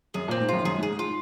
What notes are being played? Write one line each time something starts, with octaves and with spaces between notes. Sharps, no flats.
F#2 G#4
A#2 C4
G#2
F#2 F4
F#2 G#4
G#2
G#4
G#2
F4